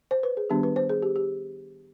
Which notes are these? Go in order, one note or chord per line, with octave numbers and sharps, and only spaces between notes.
C5
B4
G#4
D#3 G3 B3 D4 G4
B4
C5
G#4
G4
G4